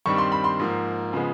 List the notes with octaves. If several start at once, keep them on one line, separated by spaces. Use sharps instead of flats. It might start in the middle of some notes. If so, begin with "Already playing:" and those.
G2 D#3 G3 C4 C#6
C6
B5
C6
G#2 F3 A#3
C#3 F3 G#3 B3